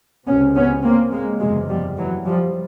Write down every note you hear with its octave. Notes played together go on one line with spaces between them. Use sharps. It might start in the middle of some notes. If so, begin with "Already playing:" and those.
C#2 C3 B3 C#4
B3 C#4
A#3 C4
G#3 A#3
F#1 E2 C3 F#3 G#3
F3 G3
E3 F#3
F3 G3